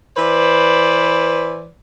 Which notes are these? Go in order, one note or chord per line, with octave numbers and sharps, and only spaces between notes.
E3 B4 C5 D5